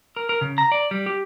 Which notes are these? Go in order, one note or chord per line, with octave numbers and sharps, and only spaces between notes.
A#4
A#4
C#3
A#5
D5
G3
G4